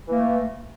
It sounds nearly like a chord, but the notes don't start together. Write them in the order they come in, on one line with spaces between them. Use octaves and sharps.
E3 A#3 A3